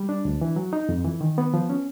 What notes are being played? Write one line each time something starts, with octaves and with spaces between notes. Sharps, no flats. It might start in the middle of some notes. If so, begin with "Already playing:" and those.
Already playing: G3
D4
D2
E3
F#3
D#4
F2
E3
D#3
B3
F3
C#4